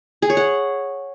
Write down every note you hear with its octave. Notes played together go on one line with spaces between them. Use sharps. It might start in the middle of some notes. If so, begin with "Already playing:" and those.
G#4
C#5
F#5